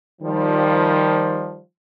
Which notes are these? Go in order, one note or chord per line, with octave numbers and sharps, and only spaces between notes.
D#3 F3 G3